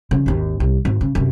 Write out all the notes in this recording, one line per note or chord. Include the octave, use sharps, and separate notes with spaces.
C#3 F3
G#1 D#2
C2
G#1
C#3
F#2 C3